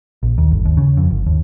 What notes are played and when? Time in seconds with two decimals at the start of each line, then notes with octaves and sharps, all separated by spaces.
0.23 A#1
0.38 D#2
0.51 G1
0.65 D#2
0.77 C#3
0.97 F2
1.11 G1
1.27 D#2